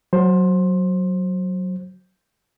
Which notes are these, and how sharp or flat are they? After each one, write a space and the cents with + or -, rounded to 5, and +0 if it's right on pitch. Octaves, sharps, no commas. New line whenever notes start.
F#3 +0 C5 +15